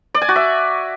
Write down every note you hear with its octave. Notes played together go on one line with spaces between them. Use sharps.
D5
G#5
F#4
E5